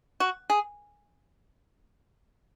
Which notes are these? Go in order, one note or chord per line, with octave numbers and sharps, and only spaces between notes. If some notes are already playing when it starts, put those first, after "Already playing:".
F#4
G#4